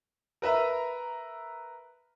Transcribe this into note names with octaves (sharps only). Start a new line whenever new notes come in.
A#4 B4 E5 A#5